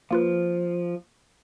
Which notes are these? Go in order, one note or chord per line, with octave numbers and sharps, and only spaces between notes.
F3 A#3 F4 B4